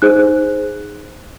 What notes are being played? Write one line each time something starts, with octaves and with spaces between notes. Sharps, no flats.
D#4 G#4 C5 F#6